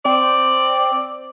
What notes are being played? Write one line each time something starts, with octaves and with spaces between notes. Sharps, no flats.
C4 D5